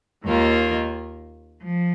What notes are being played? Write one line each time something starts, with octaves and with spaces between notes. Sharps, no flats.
D#2 D#3 A#3 F4
F3